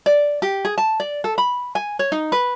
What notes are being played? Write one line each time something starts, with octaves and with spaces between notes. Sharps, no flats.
D5
G4
G#4
A5
D5
A4
B5
G#5
C#5
D#4
B4